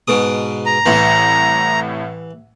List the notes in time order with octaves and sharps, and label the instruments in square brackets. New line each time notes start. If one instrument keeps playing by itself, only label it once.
[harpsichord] G#2 B2 D#6
[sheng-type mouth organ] A#5
[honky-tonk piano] C2 A2 [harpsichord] E3